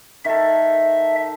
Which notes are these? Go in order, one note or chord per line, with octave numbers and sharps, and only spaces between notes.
D#3 A4 E5